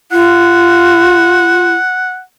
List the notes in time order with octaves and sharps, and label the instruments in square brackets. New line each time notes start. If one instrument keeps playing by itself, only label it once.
[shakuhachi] F4 [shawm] F#5